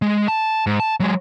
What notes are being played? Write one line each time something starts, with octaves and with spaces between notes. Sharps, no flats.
G#3
A5
G#2
A5
F#3 G#3